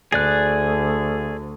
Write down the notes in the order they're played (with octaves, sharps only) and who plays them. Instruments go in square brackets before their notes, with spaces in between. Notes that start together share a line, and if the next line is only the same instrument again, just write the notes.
[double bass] D2 [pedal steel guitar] G#4 D5 F#6